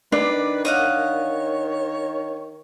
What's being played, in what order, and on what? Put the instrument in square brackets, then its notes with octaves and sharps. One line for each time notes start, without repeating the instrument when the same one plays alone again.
[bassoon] D#3 [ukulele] D4 [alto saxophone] B4 [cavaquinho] D5
[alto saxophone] C#5 [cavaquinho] D#5 F5 F#5